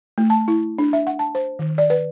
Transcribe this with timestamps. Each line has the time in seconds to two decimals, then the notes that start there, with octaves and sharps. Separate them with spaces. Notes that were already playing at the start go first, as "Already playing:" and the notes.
0.18 A3
0.30 A5
0.48 E4
0.79 D4
0.93 E5
1.07 F#5
1.19 A5
1.35 C5
1.59 D#3
1.78 D5
1.90 B4